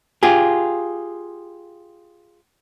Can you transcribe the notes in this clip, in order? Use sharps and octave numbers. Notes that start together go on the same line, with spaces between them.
F4 G4 G#4